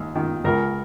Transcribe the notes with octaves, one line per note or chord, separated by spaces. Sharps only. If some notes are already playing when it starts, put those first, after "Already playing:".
Already playing: D#2
D#3
C#2 A#4